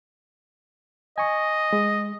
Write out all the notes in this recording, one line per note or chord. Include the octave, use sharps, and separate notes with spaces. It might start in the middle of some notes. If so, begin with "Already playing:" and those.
D#5 G#5 C#6
G#3